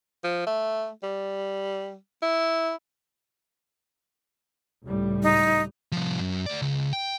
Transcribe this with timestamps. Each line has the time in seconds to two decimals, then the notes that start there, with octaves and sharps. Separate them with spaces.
0.24 F3
0.47 A3
1.03 G3
2.22 E4
4.83 C#2 A2 G3
5.23 D#4
5.92 C2 F3
6.19 F#2
6.46 A3 D5
6.62 C#2
6.93 G5